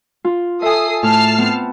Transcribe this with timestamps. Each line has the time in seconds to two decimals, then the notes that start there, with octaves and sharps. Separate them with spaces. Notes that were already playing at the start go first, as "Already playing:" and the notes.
0.24 F4
0.62 A4 E5 G#5 D#6 C7
1.03 A2 A5 F6 C7
1.38 B3 C4